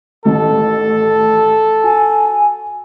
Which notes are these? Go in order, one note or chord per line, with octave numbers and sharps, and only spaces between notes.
A1 A2 D#3 A4
F#4 G#5